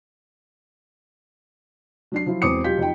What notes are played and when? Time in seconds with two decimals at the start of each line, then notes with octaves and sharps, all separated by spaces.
2.12 F#3 D4 C7
2.26 F3 F#3 E4 F4
2.42 E1 E2 C4 D6 D#6 C#7
2.64 B1 F4 G4 G6 B6
2.78 F2 D#4 G5